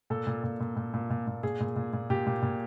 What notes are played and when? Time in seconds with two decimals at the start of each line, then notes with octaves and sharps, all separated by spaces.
0.10 A#2 A4
0.27 A#2
0.44 A#2
0.60 A#2
0.76 A#2
0.94 A#2
1.10 A#2
1.27 A#2
1.43 A#2 G#4
1.60 A#2
1.76 A#2
1.93 A#2
2.10 A#2 G4
2.27 A#2
2.42 A#2